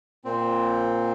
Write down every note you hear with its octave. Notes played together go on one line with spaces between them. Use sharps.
A#2 C4